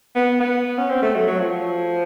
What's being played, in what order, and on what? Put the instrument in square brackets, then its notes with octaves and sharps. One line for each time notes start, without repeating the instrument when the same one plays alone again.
[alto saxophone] B3
B3
C#4
C4
A3
F#3
F#3
F3